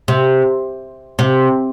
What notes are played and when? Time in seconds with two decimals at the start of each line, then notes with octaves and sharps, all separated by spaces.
0.08 C3
1.19 C3